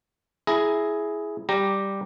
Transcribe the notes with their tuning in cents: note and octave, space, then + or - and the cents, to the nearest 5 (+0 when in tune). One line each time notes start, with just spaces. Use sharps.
E4 +0 G#4 +10 A#5 +0
G3 +0 G4 +0 A#5 +0